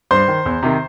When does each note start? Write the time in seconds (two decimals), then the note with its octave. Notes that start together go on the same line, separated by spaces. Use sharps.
0.11 G2 C5 C6
0.28 D#3
0.46 E2
0.63 C3 D#3